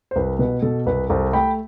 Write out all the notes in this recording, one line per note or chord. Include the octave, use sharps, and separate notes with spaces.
C5
C2 B4
B2 B4
B2 A4
C2 B4
C2 A4 C5
A3 G5 B5